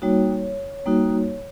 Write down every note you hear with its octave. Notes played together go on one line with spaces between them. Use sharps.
G3 A#3 D#4 F#4 C#5
G3 A#3 D#4 F#4